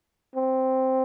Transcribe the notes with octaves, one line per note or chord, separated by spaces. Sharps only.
C4